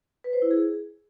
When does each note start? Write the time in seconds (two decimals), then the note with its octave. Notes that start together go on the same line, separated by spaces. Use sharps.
0.24 B4
0.33 C5
0.42 E4
0.51 G#4